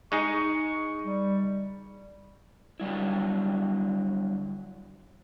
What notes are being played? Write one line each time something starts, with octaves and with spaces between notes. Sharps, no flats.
G#3 D#4 G#4 C#6
G3
D3 F#3 G3 E4